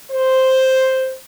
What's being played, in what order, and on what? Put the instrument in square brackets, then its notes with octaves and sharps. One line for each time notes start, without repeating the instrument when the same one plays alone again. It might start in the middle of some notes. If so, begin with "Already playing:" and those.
[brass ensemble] C5